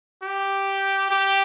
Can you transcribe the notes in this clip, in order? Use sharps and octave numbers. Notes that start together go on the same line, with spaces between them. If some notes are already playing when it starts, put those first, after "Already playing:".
G4
G4